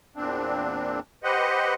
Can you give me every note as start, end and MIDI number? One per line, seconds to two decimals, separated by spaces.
0.16 1.00 40
0.16 1.00 46
0.16 1.00 60
0.16 1.00 62
1.23 1.74 67
1.23 1.74 71
1.23 1.74 72
1.23 1.74 75
1.23 1.74 78